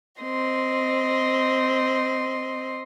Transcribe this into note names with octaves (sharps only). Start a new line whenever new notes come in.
C4 D#5 C6